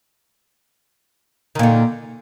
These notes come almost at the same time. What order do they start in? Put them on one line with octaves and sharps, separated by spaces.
D#3 A#2 D3